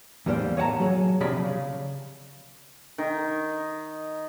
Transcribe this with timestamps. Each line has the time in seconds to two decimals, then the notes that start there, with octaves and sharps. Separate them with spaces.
0.26 E2 A2 G3 A#3 C5
0.57 C#5 D#5 F#5 A5 A#5
0.80 F#3 G#4
1.20 C3 F3 F#3 D4 G#4 B5
1.37 C#3
2.98 D#3